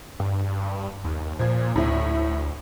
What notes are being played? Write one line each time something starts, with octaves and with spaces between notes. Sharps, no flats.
G2
D#2
A#2 F3 G#6
D2 A2 E4